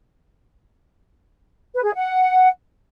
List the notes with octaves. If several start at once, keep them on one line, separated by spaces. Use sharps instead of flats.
B4
G#4
F#5